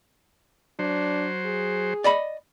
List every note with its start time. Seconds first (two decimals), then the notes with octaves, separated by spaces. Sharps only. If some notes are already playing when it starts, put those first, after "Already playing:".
0.79 F#3 D4 C5
1.46 G#4
2.04 D5 D#5 B5